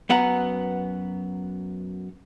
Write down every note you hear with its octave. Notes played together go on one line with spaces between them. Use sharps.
F#2 B3 F#5 A#5